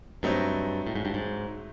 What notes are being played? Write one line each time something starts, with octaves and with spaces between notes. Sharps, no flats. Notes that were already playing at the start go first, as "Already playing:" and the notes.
G2 F#3 A3 C4 D#4
A2
G#2
G2
G#2